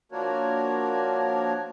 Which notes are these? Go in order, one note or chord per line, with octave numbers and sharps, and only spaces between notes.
F3 A#3 D4 F#4 A#4 C#5